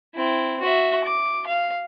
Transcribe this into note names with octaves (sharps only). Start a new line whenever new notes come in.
C4 E4
F#4 E5
D6
F5